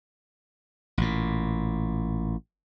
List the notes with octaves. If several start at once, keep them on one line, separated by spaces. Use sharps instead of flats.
A1 A#2